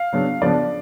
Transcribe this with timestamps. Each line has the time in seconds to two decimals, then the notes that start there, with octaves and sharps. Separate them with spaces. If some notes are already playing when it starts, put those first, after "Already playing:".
Already playing: F5
0.13 C#3 F#3 B3 D4
0.41 C#3 F3 B3 D4 D5